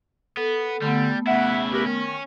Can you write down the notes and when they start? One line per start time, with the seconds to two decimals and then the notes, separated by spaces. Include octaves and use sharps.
0.37 B3 A4
0.82 D3 G3 A3 B3
1.27 C#3 E4 E5 F#5
1.73 G4 A#4 B4
1.86 D#3 C#4